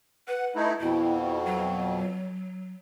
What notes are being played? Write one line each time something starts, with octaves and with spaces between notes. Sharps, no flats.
B4 F#5
A3 D#4 E4
F2 B2 E4
F#3